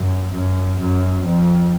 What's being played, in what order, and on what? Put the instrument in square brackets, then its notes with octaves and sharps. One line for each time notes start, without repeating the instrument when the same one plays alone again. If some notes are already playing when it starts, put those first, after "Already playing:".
Already playing: [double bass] F#2
F#2
F#2
F2